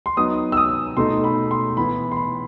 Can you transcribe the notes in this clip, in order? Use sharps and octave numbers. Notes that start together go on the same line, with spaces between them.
C6
F#3 B3 D#4 D#6
E6
D#6
B2 A3 D#4 C6
B5
C6
E3 B3 E4 B5
C6
B5